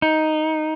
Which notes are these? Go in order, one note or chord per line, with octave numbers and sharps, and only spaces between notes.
D#4